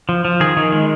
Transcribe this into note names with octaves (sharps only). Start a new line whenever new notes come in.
F3
F3
D#3 G#4
D#3
G#3